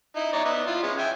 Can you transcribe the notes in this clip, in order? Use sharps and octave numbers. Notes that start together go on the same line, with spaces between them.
D#4 E4
C#5 D5 A#5
B3 D#4 E5
E3 F4
G#3 C#4
E5 G5 G#5